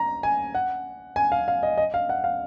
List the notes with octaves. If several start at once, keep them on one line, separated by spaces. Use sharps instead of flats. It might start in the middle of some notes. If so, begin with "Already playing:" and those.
Already playing: A#5
G#5
F#5
G#5
F5
F5
D#5
D#5
F5
F#5
F5